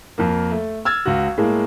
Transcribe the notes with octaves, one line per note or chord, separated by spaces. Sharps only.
F2 F3 A#3
A3
E6 F6 G#6 A6
C#2 F#4
A2 G#3 A#3